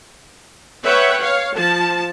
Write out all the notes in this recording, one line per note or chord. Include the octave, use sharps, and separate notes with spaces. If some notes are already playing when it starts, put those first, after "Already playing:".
B4 C#5 E5 F#5 G5
C#5 F5
F3 A5